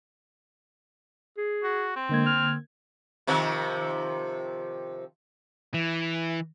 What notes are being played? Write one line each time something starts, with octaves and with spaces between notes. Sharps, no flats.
G#4
F#4
C4
D3 G#3 A#3 G#6
F6
C3 D#3 F3
E3